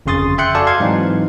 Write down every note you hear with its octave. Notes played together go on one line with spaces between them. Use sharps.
G1 F2 C#3 C6 D#6 A6
E5 G5 C6 F#6 G6 C#7
F#4 A4 D5 F5 G#5 A5
F5 C6 G#6
G#2 E3 F#3 C4 D#4